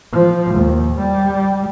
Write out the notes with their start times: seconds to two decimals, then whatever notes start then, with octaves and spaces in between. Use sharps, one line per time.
0.12 F3
0.55 D#2
1.00 G3